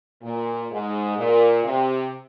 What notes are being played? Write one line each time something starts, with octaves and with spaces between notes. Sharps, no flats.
A#2
G#2
A#2
C3